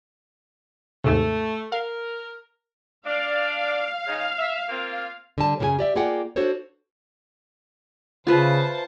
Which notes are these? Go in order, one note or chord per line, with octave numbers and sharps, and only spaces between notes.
D#2 G#2 C3 A3
A#4 F5
D4 D5 F5
C#3 D#4
E5
A#3 C4 F4
D3 G3 A5
F#2 C#3 C#4 G4 G#4 G#5
G4 D5 E5
A#3 F4 G#4 D5 F#5 G5
D4 F#4 A4 C5 C#5
C#3 F4 B4 C5 E5 A5